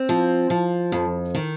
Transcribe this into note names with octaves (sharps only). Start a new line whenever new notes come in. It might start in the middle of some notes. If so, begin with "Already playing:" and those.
Already playing: C4
F3
F3
F2
D#3